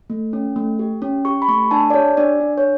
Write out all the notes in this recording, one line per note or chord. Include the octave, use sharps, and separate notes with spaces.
A3
C#4
A3
G4
C#4
G4 C#6
B5
A3 C#6
D4 A5
D5
G4 C#5
D4 D5
D4
C#5